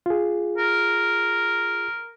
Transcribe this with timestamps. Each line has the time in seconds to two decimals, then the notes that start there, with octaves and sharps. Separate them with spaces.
0.06 F4 G#4
0.58 A#4